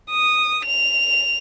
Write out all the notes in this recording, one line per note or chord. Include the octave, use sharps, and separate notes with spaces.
D#6
F7